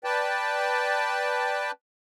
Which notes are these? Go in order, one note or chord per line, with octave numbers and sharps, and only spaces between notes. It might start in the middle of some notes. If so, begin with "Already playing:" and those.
B4 D5 G5 A5